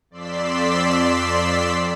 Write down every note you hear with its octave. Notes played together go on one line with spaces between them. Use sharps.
F2 D5 C6 E6 B6